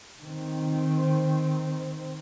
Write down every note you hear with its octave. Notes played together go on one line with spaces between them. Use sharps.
D#3 C4